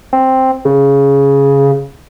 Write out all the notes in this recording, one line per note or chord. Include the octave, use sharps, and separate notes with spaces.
C4
C#3